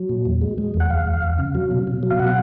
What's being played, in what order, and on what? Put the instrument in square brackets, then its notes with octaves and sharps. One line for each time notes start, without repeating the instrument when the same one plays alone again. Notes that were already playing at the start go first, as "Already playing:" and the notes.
Already playing: [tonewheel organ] F#3
A#2
E2
G#3
G#3
E2
F#5
E2 F5
E2
E2
C#3
F#3
B2
B2
F#3
F5
B2 F#5